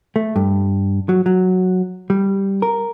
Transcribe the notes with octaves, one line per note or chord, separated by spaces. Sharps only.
A3
G2
F#3
F#3
G3
A#4